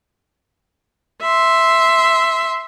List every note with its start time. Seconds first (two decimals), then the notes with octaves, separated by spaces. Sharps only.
1.22 E5 C6